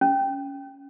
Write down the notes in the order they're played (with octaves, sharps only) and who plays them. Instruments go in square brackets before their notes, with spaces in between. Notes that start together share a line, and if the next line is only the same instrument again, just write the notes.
[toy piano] C#4